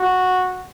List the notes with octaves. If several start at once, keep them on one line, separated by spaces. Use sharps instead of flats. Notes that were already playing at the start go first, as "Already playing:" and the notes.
Already playing: F#4